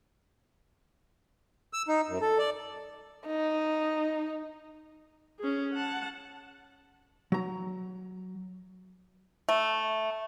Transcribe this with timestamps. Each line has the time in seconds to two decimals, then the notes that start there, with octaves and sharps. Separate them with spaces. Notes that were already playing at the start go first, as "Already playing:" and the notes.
1.73 E6
1.88 D#4
2.08 F#2
2.21 A4
2.38 D5
3.27 D#4
5.39 C#4 G#4
5.74 F#5 A5
7.32 F#3 A#5
9.49 A3